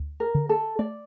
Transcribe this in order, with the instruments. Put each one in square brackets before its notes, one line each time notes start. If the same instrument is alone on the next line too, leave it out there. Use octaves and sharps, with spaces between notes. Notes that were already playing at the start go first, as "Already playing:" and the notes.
Already playing: [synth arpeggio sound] D2
[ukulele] A#4
[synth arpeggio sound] D3
[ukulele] A4
[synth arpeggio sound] A3 [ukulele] D5